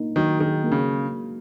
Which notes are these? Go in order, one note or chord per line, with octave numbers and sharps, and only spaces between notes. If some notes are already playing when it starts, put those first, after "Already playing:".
Already playing: A#3 D#4
D#3 F#3
D#3 G#4
A#3
C#3